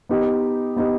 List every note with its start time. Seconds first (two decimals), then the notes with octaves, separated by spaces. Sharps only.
0.09 B3 D#4 G4
0.76 B3 D#4 G4